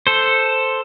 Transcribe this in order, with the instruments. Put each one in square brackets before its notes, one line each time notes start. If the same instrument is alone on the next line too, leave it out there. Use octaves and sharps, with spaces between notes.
[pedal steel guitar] A4 C5